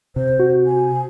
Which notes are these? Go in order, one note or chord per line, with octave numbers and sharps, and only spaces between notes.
C3 C5
F#4
G#5